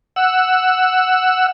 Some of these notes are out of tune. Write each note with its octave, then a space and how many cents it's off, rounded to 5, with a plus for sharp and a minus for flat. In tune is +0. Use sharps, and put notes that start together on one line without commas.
F#5 +0 E6 +0